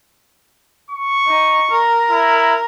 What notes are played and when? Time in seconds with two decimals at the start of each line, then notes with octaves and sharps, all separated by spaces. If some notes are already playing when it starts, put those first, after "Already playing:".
0.90 C#6
1.28 D#4
1.71 A#4
2.11 E4